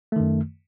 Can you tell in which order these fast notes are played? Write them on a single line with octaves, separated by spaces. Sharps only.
A3 D#3 F#2